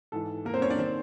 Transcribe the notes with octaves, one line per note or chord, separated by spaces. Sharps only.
G#2 E3 A4
A#3 A#4
C4 C5
C#4 C#5
D4 D5
D#3 C4 C5